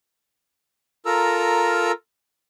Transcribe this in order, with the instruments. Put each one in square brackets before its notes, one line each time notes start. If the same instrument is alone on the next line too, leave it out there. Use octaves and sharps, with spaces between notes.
[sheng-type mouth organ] F4 A4 A#4 A#5 E6